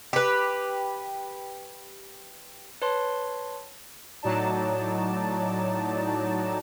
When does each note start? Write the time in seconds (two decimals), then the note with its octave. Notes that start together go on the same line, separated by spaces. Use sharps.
0.13 G4 B4
2.82 B4 C#5 A5 C6
4.23 A2 F#3 D#4 D5 A5